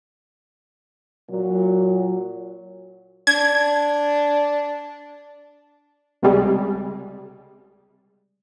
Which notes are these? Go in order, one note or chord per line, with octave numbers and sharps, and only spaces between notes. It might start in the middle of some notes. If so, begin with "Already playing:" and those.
A#2 F#3
D4 G#6
C#2 C3 G3 G#3